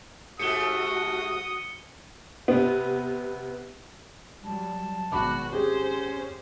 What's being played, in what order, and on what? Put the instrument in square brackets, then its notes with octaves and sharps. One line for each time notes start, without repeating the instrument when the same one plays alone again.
[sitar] G#2 A3 G4 [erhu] F#4 [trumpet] D#6 [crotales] C#7 G7
[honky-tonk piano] C3 B3
[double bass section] F#3 G3 [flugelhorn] A5
[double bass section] G#1 B2 B3 [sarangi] F#4 [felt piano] B5 D6
[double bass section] C4 [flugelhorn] C#4 [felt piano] G4 G#4 [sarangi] C5